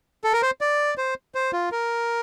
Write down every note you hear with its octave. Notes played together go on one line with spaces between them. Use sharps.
A4
A#4
C5
D5
C5
C5
F4
A#4